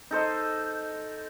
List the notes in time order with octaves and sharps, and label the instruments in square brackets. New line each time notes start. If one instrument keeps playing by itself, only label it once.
[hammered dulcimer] D#4 A4 C5 D#5